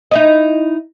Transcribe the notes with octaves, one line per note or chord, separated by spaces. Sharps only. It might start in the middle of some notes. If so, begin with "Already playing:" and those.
D#4 E4 D#5